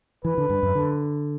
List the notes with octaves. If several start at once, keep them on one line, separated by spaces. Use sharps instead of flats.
E3 B4
D3
G2
F#2
D3